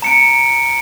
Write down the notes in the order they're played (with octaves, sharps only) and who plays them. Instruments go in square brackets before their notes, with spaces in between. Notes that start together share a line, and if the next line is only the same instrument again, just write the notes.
[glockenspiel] A#5 C#7 D7